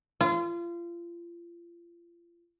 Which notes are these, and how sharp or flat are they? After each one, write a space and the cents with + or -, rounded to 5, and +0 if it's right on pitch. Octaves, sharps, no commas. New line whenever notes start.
F4 -30